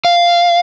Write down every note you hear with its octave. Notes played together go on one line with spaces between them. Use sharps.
F5